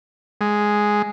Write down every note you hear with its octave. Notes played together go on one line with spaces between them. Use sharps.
G#3